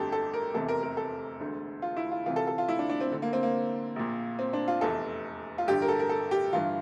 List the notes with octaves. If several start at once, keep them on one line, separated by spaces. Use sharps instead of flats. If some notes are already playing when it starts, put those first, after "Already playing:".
Already playing: G1 F2 D3 G4 A4
A4
A#4
F1 E2 C3 E3 A4
A#4
A#4
A4
E1 D2 D3
F4
E4
F4
C2 C3 E3 F4
A4
A4
F4
E4
D4
D4
C4
D2 D3
A#3
C4
A#3
A#1 A#2
C4
D4
F4
F1 E2 E3 A4
F4
A1 G2 D3 G4
A#4
A4
A#4
A4
G4
G1 G2 E3 F4